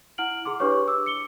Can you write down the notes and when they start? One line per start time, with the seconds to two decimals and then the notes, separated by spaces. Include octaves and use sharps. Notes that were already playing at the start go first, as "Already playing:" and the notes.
0.18 E4 F#5 F6 D7 F#7
0.45 E4 G#4 C6 D6
0.60 D4 G4 B4 C#5 C#6
0.88 D6 E6
1.06 C#7 G7